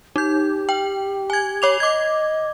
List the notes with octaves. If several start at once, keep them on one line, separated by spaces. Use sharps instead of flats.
D#4 G4 G6
G5
G#5 G#6
C#5 D6 F7
D#5 D6 G#6